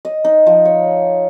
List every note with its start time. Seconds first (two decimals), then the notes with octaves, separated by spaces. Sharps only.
0.05 D#5
0.24 D#4
0.46 F3
0.65 C#5